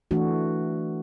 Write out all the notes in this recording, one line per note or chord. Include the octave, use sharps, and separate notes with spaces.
E3 A3 D4 F#4